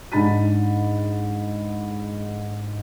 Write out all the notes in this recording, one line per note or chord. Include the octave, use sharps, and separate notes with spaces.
G#2 D4 B5 A6 B6 D#7